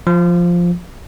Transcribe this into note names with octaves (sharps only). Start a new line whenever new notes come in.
F3